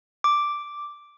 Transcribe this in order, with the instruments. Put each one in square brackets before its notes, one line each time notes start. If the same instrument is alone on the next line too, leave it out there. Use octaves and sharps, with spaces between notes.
[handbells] D6